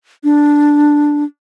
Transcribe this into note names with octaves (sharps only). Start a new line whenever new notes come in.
D4